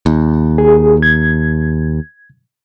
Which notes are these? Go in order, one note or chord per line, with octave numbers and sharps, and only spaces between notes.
D#2
G#4
G#6